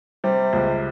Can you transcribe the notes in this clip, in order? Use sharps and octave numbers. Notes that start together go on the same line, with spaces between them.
C3 G3
C#2